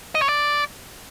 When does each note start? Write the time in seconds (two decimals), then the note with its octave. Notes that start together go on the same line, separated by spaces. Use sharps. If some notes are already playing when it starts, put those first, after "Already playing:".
0.15 D#5
0.22 C#5
0.29 D5